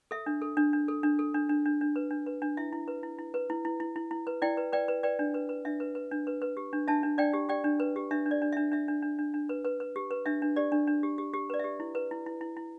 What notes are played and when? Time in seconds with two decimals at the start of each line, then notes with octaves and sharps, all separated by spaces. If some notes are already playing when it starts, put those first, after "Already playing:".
0.11 A4 E5
0.26 D4
0.42 A4
0.57 D4
0.73 D4
0.88 A4
1.03 D4
1.19 A4
1.34 D4
1.49 D4
1.66 D4
1.81 D4
1.96 B4
2.11 D4
2.26 B4
2.42 D4
2.57 E4 E5
2.73 E4
2.88 B4
3.03 E4
3.19 E4
3.34 B4
3.50 E4
3.65 E4
3.80 E4
3.96 E4
4.11 E4
4.27 B4
4.42 E4 D5 G5
4.57 B4
4.73 B4 D5 G5
4.88 B4
5.03 B4 D5 G5
5.19 D4
5.34 B4
5.49 B4
5.65 D4 E5
5.80 B4
5.95 B4
6.11 D4
6.27 B4
6.42 B4
6.57 G4
6.73 D4
6.88 D4 E5 A5
7.03 D4
7.18 D4 D5 G5
7.33 G4
7.49 G4 D5 G5
7.64 D4
7.80 B4
7.96 G4
8.11 D4 E5
8.26 D4
8.31 D5
8.42 D4
8.52 D4 E5
8.72 D4 E5
8.88 D4
9.02 D4
9.19 D4
9.34 D4
9.49 B4
9.65 B4
9.80 B4
9.96 G4
10.11 B4
10.26 D4 E5
10.42 D4
10.56 G4 D5
10.72 D4
10.87 D4
11.03 G4
11.18 G4
11.33 G4
11.50 B4 D5
11.59 G4 E5
11.80 E4
11.95 B4
12.11 E4
12.26 E4
12.41 E4
12.57 E4